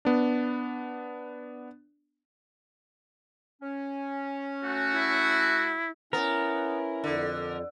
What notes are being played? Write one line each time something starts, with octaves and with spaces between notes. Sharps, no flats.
B3 D4
C#4
A3 F#4
E4
B3 C#4 E4 A#4
F2 D3